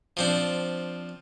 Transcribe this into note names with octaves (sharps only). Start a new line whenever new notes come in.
F3 C4 D4